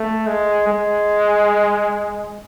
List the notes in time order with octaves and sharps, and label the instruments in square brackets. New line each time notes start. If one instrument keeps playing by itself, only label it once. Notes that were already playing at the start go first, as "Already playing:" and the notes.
Already playing: [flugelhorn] A3
G#3
G#3